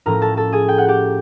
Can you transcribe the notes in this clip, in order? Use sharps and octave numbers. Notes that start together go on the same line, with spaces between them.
A2 F3 A3 C#4 A#4 A#5
A4 A5
A4 A5
G#4 G#5
G5
F#5
G4 G5